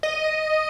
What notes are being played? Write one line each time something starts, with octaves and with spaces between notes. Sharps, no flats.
D#5